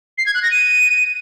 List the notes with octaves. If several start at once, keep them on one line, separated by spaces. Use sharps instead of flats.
C7
G#6
F#6
A#6
D#7